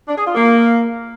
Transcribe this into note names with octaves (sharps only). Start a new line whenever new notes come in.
D4
G#4
F4
A#3